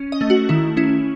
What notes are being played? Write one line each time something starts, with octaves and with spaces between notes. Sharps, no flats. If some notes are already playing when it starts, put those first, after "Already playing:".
Already playing: C#4
D#5
A3
F#4
D#3 E4
C#4 E4